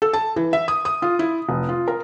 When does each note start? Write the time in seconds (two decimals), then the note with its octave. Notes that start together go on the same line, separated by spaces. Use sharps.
0.02 A4
0.13 A5
0.36 E3
0.53 E5
0.68 D#6
0.85 D#6
1.02 F4
1.19 E4
1.49 F1
1.69 F4
1.88 A#4